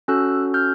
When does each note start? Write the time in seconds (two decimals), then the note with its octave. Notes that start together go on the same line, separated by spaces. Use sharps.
0.08 C#4 F#4 A4 E6 F#6
0.54 F6 G6